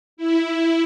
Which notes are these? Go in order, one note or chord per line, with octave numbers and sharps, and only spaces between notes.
E4
E4